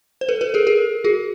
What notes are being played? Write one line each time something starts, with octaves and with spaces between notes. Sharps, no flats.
C5
A4 B4
A4 B4
G#4 A#4
G#4 A#4
F#4 G#4